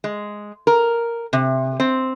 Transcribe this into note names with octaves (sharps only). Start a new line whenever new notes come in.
G#3
A#4
C3
C4